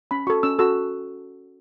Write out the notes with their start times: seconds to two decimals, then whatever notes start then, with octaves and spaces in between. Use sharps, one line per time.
0.11 C#4 B5
0.27 F#4 A4 C#6
0.43 C#4 E6
0.59 F#4 A4 E6